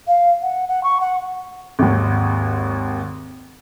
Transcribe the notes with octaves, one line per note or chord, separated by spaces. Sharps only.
F5
F#5
F#5
C#6
F#5
G#1 D#2